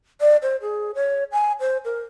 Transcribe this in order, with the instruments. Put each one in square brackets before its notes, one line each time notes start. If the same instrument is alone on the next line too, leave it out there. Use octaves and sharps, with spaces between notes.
[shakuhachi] D5
C5
G#4
C#5
G#5
C5
A#4